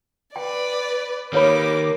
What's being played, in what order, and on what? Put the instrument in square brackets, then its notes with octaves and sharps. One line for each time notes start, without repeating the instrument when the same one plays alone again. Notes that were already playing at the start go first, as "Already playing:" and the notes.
[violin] B4 D5 [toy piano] G5
[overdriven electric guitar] D#3 A#3 [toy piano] B4 C#5 B5 [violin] D6